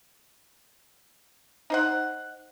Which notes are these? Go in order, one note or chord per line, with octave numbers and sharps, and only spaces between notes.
D#4 C5 F#5